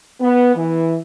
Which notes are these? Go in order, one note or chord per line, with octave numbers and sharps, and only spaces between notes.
B3
E3